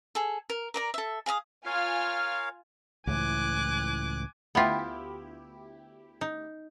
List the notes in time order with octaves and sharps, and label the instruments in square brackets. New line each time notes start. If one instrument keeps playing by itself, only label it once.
[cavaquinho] G#4 A4
A#4
A#4 D5 A#5
A4 E5
G#4 F5 A#5 D#6
[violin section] F4 G#5 F6 [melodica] A#4 C#5 F5
[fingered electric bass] C#2 A2 E3 [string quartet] G#5 D6 F#6
[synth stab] D2 E4 G4 [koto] B3 F4
[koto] D#4